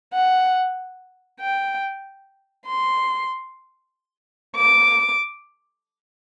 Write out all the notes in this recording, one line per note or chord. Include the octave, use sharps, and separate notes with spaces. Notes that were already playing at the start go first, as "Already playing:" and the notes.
F#5
G5
C6
D6